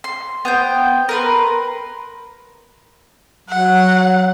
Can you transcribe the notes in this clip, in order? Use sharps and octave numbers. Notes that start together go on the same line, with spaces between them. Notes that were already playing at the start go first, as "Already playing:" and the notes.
C6
B3 C5 G5
A#4 B4 C6
F#3 F#5